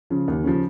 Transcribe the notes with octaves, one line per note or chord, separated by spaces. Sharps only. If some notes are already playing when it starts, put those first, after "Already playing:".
C#3 F3
D#2
C#3 F3